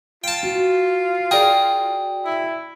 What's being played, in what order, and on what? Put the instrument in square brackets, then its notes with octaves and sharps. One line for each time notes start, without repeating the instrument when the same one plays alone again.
[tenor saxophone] F4 [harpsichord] G5 A5
[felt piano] F#4
[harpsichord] G#4 A#4 [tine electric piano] D5 G5
[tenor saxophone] E4